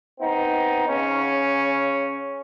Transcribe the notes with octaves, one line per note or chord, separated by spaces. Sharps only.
B3 C4 D#4
C#3 C#4